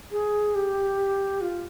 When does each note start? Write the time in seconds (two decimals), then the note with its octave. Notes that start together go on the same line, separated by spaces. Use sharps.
0.11 G#4
0.55 G4
1.41 F4